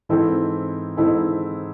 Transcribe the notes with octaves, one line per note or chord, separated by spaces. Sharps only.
G#2 E3 C4 E4 A4
G#2 E3 C4 E4 A4